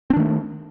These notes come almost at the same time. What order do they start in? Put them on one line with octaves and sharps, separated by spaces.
C4 D4 D#3 A3